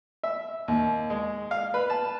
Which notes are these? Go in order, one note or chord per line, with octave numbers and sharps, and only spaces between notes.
E5
D#2
G#3
F5
B4
A5